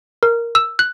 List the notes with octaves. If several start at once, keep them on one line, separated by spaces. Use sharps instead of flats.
A#4
E6
F#6